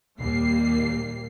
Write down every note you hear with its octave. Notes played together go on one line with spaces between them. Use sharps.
D#2 A#2 G3 A#3 C7